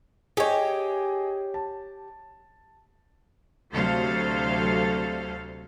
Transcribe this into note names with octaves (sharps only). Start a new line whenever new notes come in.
G4 G#4 C#5 D#5
A5
D2 C3 F#3 A4 C5 F5